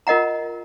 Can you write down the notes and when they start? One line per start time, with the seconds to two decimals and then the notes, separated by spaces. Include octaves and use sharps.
0.07 F4 A#4 D#5 F#5 A#5